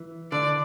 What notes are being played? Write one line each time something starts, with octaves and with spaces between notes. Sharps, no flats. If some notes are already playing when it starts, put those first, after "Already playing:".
Already playing: E3
D3 D5